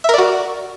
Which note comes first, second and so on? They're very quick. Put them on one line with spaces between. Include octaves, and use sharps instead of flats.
E5 A#4 D5 F#4